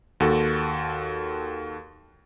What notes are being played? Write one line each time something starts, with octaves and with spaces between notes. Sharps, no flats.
D#2 F#4 A4